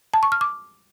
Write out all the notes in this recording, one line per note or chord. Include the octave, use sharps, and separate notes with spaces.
A5
C#6
F6
D6